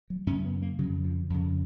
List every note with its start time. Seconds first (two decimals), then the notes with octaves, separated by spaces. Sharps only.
0.10 F#3
0.27 F#2 C#4
0.30 C#3
0.45 B3
0.62 A#3
0.79 C#3 F#3
0.83 F2
1.04 F3
1.30 F2 C#3